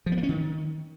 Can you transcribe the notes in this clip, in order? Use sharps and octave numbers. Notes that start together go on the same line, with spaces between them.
F3
B3
A#3
C#4
D#3